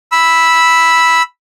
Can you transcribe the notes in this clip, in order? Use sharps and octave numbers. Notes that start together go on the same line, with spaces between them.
B5 E6